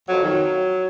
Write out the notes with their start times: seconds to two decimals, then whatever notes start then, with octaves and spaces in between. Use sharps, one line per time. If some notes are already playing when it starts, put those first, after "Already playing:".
0.08 F2 F#3
0.23 D#3 F#3